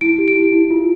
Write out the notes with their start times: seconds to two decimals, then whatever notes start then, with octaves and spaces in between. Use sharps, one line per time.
0.01 E4 D7
0.18 G4
0.28 D7
0.36 E4
0.52 E4
0.70 F4